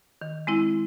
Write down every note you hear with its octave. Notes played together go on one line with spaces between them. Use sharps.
D#3
G#3 C4 E4